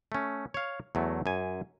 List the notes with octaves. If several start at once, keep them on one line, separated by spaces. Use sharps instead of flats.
A3 C#4
C#5 F5
E2 F#3 A3
F#2 G#5